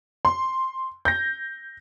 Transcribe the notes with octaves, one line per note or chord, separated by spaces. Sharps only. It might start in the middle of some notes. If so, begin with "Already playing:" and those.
C6
G6 A#6